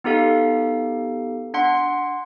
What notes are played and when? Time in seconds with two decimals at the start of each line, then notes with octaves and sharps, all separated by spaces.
0.04 B3 D#4 G4 A4 F5
1.54 D4 F#5 C6